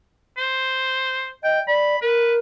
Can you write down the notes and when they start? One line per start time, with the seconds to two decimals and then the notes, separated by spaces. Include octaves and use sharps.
0.37 C5
1.44 D#5 G5
1.68 D5 B5
2.02 A#4 B4